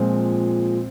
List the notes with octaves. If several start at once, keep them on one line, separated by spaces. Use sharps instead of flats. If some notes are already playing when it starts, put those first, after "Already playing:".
Already playing: A#2 F3 G#3 C4